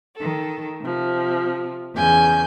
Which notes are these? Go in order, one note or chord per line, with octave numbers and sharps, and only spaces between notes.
D#3 A4
C3 F3
E2 C#3 G#5 G6